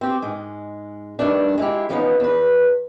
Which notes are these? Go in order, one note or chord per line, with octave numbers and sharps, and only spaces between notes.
C4 G4
G#2 G#3
G2 D#3 A3 D4
G#3 E4 F4 G4
E3 F3 G3 B3 C#4 D#4
E2 B4